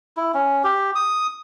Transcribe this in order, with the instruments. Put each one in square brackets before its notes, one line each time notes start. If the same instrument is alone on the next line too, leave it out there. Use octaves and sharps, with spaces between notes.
[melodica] E4
C#4
G4
D#6